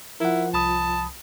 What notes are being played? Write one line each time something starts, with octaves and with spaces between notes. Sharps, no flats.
F3 E4 A#4 F#5
C2 A5 B5 D#6